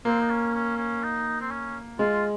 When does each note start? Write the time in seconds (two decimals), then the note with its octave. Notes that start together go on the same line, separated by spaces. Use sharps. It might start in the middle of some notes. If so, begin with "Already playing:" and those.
0.05 A#3 C4
0.20 D#4
0.29 C#4
0.54 C#4
0.77 C#4
1.03 D#4
1.41 C4
1.50 C#4
1.99 G#3 F4